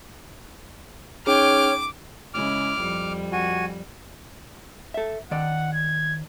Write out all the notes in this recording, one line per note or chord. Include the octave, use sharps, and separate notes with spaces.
C#4 D#4 G#4 C#5 G5 D6 F6
C#3 G#3 E4 D6 F6
F2 G3
F#4 G#5
A4 E5
D#3 D5 F#5
G#6